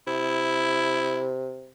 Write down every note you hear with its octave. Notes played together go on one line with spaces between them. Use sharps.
C3 E4